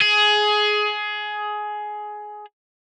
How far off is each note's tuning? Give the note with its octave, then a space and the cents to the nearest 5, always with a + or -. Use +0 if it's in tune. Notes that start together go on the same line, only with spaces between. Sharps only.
G#4 +15